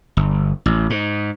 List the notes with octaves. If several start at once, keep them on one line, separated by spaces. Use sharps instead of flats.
G1
A1
G#2